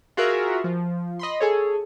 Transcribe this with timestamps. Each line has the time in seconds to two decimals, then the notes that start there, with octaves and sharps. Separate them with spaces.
0.17 F4 F#4 G#4 A#4 E5
0.64 F3
1.19 D#5 B5 C6
1.40 G#4 A4 C#5